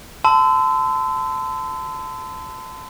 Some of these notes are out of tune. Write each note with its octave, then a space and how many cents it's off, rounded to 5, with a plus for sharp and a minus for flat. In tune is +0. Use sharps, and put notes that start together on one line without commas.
A5 +5 C6 -40 E6 +0